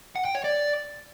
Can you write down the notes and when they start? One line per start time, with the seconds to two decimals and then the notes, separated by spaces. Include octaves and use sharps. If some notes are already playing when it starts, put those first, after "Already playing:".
0.16 F#5
0.25 G5
0.35 C#5
0.44 D5